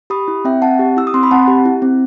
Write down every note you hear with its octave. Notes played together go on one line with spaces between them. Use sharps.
G4 B5 D#6
E4
C4 E5 G5
C4 F#5 A5
G4
E4 E6
D#6
C4 C6
B5
C4 F#5 A5
G4
E4
C4